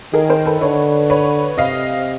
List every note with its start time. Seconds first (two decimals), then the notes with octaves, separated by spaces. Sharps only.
0.14 D#3 G#4 A#4
0.29 A#4 C5
0.46 A4 B4
0.61 D3 B4 C#5
1.10 B4 C#5
1.58 C3 D#5 F5